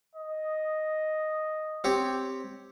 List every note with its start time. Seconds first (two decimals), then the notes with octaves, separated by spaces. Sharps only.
0.16 D#5
1.84 C4 G4 C#5